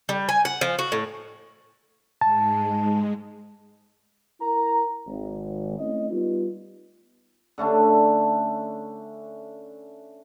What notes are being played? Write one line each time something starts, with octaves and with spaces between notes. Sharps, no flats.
G3
G#5
F#5
F3
F#4
A2
G#2 G#3 A5
E4 A#4 A#5
G#1
A3 C4 C#4 E4 D#5
G3 B3 D#4 F4
D3 A3 C#4 D4